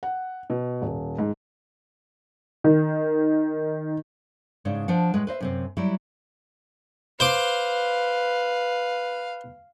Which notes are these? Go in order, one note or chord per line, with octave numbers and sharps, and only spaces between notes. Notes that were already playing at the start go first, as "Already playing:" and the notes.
F#5
B2
D#1
G#2
D#3
G#2 C#3 C#4 D4
F3 D4 F#5
A2 G#3 B4
B4 C5 D#5 E5
F#2 C3 C4
F#3 G3 E4 F#4 G4
B4 C5 F5 C6 D6